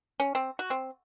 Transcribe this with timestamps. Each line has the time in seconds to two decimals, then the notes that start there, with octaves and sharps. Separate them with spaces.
0.20 C#4
0.35 C4
0.59 F#4
0.70 C4